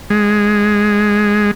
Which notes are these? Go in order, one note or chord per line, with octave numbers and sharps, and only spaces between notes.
G#3